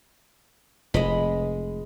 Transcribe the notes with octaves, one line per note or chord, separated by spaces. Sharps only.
F1 G#3 D#5 B5